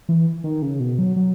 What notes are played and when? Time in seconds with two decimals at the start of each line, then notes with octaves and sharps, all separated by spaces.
0.09 E3
0.44 D#3
0.62 C#3
0.80 B2
0.99 F#3
1.16 F#3